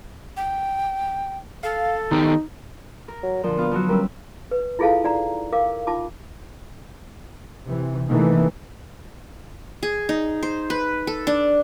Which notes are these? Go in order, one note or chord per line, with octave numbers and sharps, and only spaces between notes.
G5
A4 F5
D#3 B3 D#4 G4
A#4
F#3
A#2 D3 F3
B3 F4
F3 F#3 F#4
G3 C#4 A#4 E6
B4
E4 F4 G#4 A4 F5 A5
D#4 D5 F#5 A#5
A#4 F5 D6
D#4 F4 A5 D6
C3 E3
C3 D#3 E3 A3 A#3
G#4
D#4
C5
B4
A4
D4